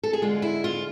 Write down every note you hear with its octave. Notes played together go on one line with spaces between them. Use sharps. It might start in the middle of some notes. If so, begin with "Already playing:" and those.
A4
G#4
D3 G#3 F4
E4
F4